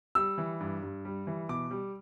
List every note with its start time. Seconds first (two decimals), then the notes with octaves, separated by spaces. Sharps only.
0.15 G3 E6
0.38 E3
0.60 G2
0.82 G2
1.05 G3
1.27 E3
1.48 B2 D6
1.70 G3